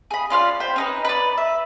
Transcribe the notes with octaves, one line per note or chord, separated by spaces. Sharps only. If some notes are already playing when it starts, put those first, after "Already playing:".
G#4 B5
C#4 F4 D5 F6
C5 G5 B5
C#4 D#4 B4
B4 D5
E5